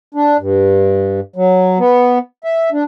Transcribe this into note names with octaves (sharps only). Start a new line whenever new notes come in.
D4
G2
F#3
B3
E5
D4